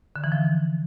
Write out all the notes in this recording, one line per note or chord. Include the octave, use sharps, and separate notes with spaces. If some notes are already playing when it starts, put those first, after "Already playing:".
D3
E3
F3